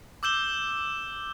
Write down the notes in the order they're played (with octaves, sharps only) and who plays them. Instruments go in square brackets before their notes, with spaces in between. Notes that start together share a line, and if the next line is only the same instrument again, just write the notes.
[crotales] D6 E6 G6 E7 G7